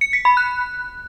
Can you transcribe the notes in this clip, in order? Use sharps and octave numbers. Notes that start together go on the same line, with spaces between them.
C#7
B6
B5
F#6